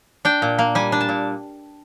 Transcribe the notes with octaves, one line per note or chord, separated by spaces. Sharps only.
D4 G5
A#2
A#3
G3 G#5
D4
A5
A#2